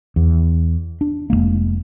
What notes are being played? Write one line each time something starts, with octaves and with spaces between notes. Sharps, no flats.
E2
D4
F1 G#2 G#3 A#3